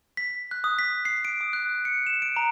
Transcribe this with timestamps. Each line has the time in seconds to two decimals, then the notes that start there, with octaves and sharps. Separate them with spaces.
0.17 B6
0.51 F#6
0.64 D#6
0.79 B6
1.05 C7
1.25 D7
1.41 D#6
1.53 F#6
1.85 C#7
2.07 E7
2.22 D7
2.36 A#5